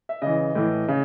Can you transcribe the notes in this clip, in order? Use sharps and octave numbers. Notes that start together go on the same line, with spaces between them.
E5
C#3 E3 D#5
A2 E3
C#3